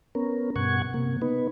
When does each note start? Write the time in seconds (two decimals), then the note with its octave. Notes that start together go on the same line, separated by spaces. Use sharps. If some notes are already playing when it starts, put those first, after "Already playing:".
0.15 B3 C#4 A#4
0.56 G2 B2 F#5 C#6 G#6
0.94 C3 A#3
1.22 B3 D#4 B4